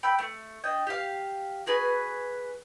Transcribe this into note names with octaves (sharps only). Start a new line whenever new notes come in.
G5 B5 E6 G6
A3
D4 D#5 G5
G4 F5
F#4 G#4 B4 G#5